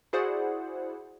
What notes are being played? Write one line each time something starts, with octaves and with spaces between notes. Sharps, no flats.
E4 F#4 G#4 C5 D5 F#5